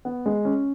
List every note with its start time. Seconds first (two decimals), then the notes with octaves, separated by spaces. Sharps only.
0.05 B3
0.26 G#3
0.45 C#4